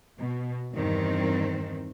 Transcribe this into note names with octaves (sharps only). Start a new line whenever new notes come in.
B2
E2 G2 D#3 C4